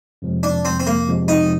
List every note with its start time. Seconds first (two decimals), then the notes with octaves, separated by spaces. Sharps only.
0.22 F2 C3 F3 G#3
0.43 D4
0.65 C4
0.80 C4
0.87 A#3
1.08 F2 C3 F3 G#3
1.28 D#4